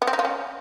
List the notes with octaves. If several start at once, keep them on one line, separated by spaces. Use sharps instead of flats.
B3
C4
D#4
F4
C#4